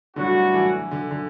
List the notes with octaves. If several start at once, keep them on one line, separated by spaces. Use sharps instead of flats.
A2 D3 F#3 G3 B3 D4 F#4
E3
D3
D3